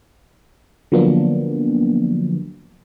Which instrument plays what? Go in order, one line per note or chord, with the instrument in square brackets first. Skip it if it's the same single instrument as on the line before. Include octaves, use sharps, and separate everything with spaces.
[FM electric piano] D3 F3 F#3 A#3 B3 D4